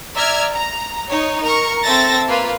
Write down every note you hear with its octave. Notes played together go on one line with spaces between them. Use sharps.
D5 E5 A#5 F6 G#6
A#5
D#4 C#5
A#4 A#5 C#6
C4 A4 E5 A5 A6 A#6
A#3 F4 B4